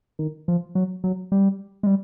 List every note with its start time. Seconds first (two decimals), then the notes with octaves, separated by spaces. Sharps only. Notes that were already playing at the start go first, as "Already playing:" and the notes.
0.19 D#3
0.48 F3
0.75 F#3
1.04 F#3
1.32 G3
1.83 G#3
1.87 G3